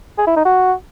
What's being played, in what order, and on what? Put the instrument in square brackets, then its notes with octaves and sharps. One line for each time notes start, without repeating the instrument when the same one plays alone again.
[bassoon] G#4
E4
D#4
F#4